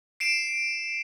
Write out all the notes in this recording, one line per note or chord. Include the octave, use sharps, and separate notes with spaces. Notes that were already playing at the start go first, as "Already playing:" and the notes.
C7 D7 E7